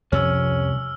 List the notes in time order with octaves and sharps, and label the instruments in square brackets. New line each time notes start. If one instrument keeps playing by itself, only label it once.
[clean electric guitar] C2 [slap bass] F2 F3 G3 [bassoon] C#4 [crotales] E6 F6